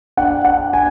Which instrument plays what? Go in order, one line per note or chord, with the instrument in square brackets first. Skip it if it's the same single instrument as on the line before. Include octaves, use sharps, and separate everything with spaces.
[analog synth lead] D4 [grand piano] F#5
[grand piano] F#5
G#5